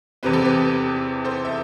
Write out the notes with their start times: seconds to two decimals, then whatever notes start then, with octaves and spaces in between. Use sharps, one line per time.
0.23 E2 C3 E3 G3 C4 B4
0.33 A4
0.45 G4 B4
1.25 A4 C5
1.45 E5